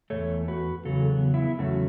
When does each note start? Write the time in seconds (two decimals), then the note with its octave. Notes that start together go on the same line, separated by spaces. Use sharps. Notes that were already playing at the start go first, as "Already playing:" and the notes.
0.10 E2 B2 A3 A4 C#5
0.48 F#4 B4
0.85 E2 C#3 F#3 A4
1.10 B3
1.34 B3 E4
1.59 E2 C#3 F#3 A3 C#4 F#4